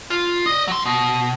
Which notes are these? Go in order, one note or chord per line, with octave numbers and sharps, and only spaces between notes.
F4
D5 D#5
F#3 C6
B2